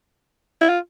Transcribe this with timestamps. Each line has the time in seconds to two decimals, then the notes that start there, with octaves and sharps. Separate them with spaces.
0.61 E4
0.69 F4